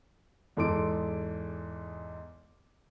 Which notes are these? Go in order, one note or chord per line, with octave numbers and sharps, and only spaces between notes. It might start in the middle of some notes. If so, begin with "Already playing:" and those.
E2 G#2 A4 C6 D6 D7